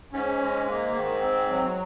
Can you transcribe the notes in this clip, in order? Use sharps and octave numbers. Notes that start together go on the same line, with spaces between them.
G#2 C#4
G#3
A#3
D#3
C4
F#3